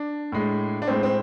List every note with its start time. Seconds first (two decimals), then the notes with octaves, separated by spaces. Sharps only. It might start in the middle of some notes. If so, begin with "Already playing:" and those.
Already playing: D4
0.32 A2 G#3
0.82 D4
0.87 A2 G#3 C4
1.03 C4